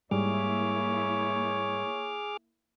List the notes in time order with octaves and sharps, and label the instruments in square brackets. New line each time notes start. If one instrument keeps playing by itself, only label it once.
[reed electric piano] G#2 G3 [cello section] A#3 E4 [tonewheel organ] G#4 D6 F6 [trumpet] C#5